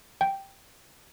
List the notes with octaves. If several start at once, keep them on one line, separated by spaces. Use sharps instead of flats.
G5